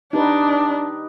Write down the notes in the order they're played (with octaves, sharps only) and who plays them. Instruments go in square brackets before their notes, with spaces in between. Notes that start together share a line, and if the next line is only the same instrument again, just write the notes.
[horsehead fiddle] D4 [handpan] D#4 G4 B4